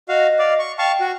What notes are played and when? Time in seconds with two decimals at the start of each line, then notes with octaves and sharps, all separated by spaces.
0.09 F#4 D#5 F5
0.39 D5 F5
0.59 C#6
0.78 F5 G5 A5 C#6
1.00 F#4